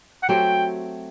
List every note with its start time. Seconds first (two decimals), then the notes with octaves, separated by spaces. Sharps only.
0.23 F#5
0.29 F#3 A3 C4 G4 G5